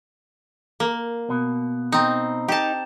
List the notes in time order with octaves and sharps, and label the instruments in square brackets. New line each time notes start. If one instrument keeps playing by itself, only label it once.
[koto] A#3
[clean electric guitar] B2
[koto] C4 D#4
[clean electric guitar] D#4 [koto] G4 A5